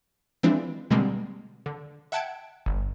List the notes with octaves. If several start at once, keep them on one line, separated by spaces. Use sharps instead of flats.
E3 F3 G#3 C4 D4 E4
B2 D3 G3 G#3 A#3 C4
D3
E5 F#5 G5 A5 G#6 D7
G1